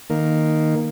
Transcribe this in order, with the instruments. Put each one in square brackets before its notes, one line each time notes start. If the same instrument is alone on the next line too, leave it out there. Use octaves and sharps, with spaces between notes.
[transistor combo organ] D#3 A#3